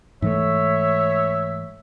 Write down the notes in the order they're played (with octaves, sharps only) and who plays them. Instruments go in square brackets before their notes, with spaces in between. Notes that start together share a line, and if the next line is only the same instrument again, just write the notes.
[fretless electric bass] G#2 E3 A3 [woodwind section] C#5 E5